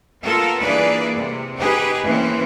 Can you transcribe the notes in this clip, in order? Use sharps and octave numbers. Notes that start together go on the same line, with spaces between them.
A#3 B3 F4 A4 A#4
E3 A#3 D4 G#4 B4 D5
C3
D#4 G4 G#4 B4
E3 A#3 C4 C#4